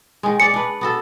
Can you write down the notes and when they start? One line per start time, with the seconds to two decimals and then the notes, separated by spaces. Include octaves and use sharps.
0.23 D#3 G#3
0.40 G#3 D5 C#7
0.54 D4 B4
0.81 B3 F#4 A4